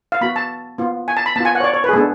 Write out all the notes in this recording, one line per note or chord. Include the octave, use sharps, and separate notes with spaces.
F5
B3 F#4 B5
A5
B3 F4
G#5
A5
B5
B3 F4 G#5 A5
F#5
C#5
D5
C#5
B4
G#4
G#3 B3 D4 A4